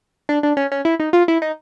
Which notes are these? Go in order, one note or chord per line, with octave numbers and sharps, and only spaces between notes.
D4
D4
C#4
C#4
E4
D#4
F4
E4
D#4